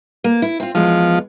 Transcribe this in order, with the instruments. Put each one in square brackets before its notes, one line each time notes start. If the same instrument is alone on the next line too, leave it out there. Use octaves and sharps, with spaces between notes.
[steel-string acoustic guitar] A#3
E4
C4 F4
[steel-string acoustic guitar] E2 G#3 [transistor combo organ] F3